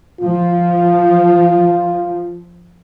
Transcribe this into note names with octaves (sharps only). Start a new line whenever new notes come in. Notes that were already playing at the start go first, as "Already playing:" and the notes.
F3 F4